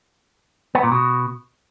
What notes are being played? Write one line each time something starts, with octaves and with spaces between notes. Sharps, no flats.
B3
A#2
B2